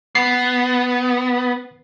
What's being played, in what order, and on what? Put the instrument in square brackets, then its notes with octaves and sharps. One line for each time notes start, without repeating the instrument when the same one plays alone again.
[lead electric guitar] B3 [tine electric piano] C7